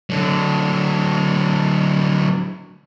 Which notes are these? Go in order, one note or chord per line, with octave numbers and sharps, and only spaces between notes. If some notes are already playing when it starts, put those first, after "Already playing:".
D3 F#3